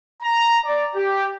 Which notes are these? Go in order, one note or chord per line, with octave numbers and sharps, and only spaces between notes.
A#5
D5
G4